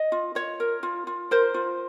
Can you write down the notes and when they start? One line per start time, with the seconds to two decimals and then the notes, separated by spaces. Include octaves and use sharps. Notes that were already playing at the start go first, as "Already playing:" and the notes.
Already playing: D#5
0.12 F4
0.35 F4 C#5
0.60 A#4
0.83 F4
1.07 F4
1.31 A#4 C5
1.54 F4